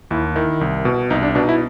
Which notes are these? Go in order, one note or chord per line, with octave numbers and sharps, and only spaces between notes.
D#2 E4
D#3 E4
C2
B2
C2 D#4
D4
B2 D4
D#4
E4